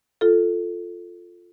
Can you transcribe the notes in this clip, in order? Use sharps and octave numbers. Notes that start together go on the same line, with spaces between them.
F4 A4